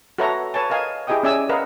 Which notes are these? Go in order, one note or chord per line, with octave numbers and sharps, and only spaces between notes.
F#4 A4 B4 C#5 E5 A#5
B4 C#5 G#5 A5
A#4 D#5 F5 G#5
E4 G4 G#4 D#5 G5 D#6
C#4 G#4 D5 E5 G#5 E6
A#4 B4 D#5 F5 F#5